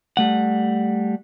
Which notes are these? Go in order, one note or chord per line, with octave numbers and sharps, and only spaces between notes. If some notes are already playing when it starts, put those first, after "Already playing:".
G3 A3 F#5